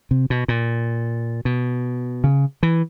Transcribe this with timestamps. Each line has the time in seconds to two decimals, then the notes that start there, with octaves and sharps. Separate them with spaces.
0.11 C3
0.30 B2
0.48 A#2
1.45 B2
2.24 C#3
2.63 E3